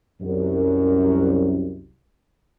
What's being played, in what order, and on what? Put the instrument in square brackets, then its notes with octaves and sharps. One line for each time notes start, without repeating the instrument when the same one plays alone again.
[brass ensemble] C2 F#2